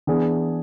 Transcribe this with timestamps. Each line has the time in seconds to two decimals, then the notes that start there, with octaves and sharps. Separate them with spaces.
0.07 E3 B3 D4 G#4